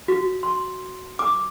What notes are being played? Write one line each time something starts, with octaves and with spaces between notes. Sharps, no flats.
F#4
C6
D6